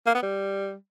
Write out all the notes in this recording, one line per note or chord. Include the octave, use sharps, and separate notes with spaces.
A#3
B3
G3